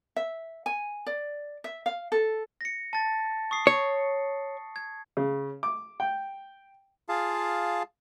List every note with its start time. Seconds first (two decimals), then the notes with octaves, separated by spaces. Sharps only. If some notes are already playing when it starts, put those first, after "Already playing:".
0.16 E5
0.66 G#5
1.06 D5
1.64 E5
1.86 F5
2.12 A4
2.61 A#6 C#7
2.93 A5 A6
3.51 C#6 D#6 C7
3.67 C#5 C#7
4.76 G#6
5.17 C#3
5.63 D6
6.00 G5
7.09 F4 G#4 F5 A5